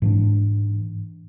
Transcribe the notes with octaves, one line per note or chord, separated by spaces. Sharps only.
G#2 E3 D4